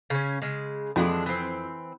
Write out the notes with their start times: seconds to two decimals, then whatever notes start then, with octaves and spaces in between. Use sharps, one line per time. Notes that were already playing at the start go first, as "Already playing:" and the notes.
0.10 C#3 C#4
0.42 C#3 G#3
0.96 F2 E3 G#3 D4
1.26 E3 C4